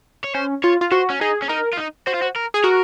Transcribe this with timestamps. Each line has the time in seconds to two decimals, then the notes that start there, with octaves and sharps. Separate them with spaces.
0.24 C#5
0.34 C#4 C5
0.63 F4 C#5
0.81 F4
0.92 F#4 C5
1.10 C#4
1.21 D#4 G#4
1.42 C#4
1.49 D#4 A#4
1.73 F4
1.77 D#4
2.07 F#4 C5
2.14 F4
2.22 F#4
2.36 A#4
2.54 G#4
2.64 F#4 A#4